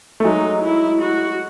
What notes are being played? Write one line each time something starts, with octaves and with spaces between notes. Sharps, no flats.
A3
F#3 G#3 D#4
E4
F#4